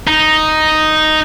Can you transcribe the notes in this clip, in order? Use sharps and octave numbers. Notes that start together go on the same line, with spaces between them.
D#4